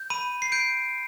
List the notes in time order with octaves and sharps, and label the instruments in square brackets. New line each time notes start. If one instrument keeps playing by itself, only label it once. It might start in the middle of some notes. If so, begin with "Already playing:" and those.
Already playing: [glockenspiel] G6
B5 D#7
C7
G6 D7